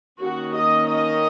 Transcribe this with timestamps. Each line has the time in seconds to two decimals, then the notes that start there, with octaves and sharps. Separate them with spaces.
0.21 D#3 A#3 C#4 F#4
0.56 D#5
0.90 D#5